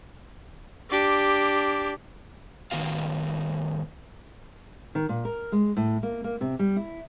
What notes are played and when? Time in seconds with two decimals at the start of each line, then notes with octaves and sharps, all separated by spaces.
0.90 D4 G4
2.71 A2 D#3 B3 F#4 F5
4.95 D#3
5.09 A#2
5.25 A#4
5.52 G#3
5.77 A2
6.03 A#3
6.24 A#3
6.41 C3
6.59 G3
6.76 E4